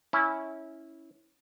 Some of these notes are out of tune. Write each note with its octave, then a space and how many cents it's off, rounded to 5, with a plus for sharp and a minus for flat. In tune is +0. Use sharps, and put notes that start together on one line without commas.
C#4 +0 E4 -15